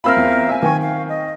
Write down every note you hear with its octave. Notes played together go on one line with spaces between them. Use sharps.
C4 F4 A#4 E5 F5 B5 E6 F6
E2
E5 G#5
D#3 G5 G#5 C#6
F5
D#5